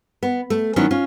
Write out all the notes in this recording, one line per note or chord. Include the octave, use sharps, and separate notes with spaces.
B3
A3
D#3 F#3 B3 C#4 D4 E4
C#4 F4